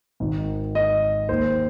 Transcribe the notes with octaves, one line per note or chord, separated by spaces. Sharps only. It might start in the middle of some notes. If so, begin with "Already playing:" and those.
G#1 G#2 D#3
D#5
D#2 D#3 C5